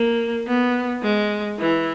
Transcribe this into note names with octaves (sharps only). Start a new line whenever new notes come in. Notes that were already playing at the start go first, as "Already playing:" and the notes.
Already playing: A#3
B3
G#3
E3